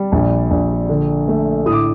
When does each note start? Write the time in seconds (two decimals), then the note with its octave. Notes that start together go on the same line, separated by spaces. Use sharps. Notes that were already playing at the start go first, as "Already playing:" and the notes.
Already playing: G3
0.12 A#1
0.50 A#1
0.89 D3
1.28 A3
1.66 A2 D#6
1.72 D6